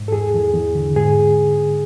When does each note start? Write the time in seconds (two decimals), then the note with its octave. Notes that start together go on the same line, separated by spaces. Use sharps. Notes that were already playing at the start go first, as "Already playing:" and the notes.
Already playing: G#2
0.08 A4
0.12 E2 G#4
0.34 E2
0.54 E2
0.75 D3
0.96 G#2 G#4